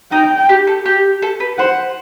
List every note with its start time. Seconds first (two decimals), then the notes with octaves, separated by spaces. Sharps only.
0.12 D#4 G5
0.49 G4
0.67 A4
0.85 G4
1.22 A4
1.40 B4
1.58 C5 F#5